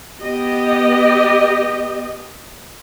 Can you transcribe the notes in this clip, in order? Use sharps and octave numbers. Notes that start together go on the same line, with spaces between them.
B3 G4 D#5